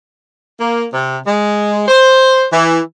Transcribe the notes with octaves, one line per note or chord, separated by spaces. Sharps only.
A#3
C3
G#3
C5
E3